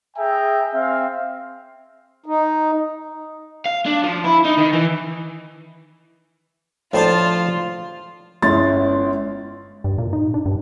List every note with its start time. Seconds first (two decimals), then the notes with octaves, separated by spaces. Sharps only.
0.16 G#4 E5 G5 G#5 A#5
0.72 C4 E5 F5
2.26 D#4
3.66 F5
3.86 D4
4.04 F3
4.25 E4
4.45 D#4
4.58 D#3
4.73 E3
6.93 A2 F3 A3 D4 F4 C5 A5
8.42 G1 G#3 C#4 E4 C6 A6
9.84 G2
9.98 A#2
10.13 D#4
10.34 D4
10.46 G2